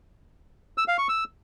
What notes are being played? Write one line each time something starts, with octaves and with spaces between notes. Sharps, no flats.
E6
F5
C#6
E6